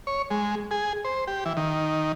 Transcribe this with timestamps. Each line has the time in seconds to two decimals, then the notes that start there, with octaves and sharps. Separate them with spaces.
0.07 C#5
0.31 G#3
0.71 G#4
1.05 C5
1.27 G4
1.45 E3
1.57 D#3